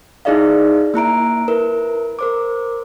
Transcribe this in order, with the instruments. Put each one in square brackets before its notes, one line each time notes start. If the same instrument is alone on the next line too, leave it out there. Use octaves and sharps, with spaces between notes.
[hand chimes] D#4 E4 G#4 D5 D#5 F5
A#3 E4 A#5 D7
E4 A#4 B4
A#4 C5 D6